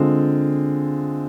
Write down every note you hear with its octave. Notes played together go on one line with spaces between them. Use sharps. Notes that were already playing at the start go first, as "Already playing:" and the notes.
Already playing: D3 G#3 C4 F4 G#4